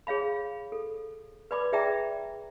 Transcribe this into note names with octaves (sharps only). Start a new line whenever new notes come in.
G#4 C#5 F5 B5
A4
B4 D5 B5 D6
G#4 D5 E5 G5 A#5